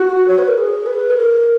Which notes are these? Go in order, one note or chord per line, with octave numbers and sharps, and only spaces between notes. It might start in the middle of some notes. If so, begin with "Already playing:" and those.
Already playing: F#4
C#5
B4
A#4
G#4
B4
G#4
A#4